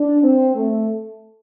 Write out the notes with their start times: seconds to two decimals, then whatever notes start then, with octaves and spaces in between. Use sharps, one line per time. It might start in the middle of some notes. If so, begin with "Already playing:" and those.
Already playing: D4
0.23 C4
0.55 A3